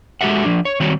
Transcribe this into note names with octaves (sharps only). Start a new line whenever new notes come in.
G#3 F#4 G4 A4 E5 F#5
F3 D4
C#5
D#3 G3 C4 F#4 C#5